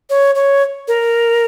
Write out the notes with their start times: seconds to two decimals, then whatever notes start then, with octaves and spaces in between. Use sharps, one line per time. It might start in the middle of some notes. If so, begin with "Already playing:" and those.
0.10 C#5
0.35 C#5
0.88 A#4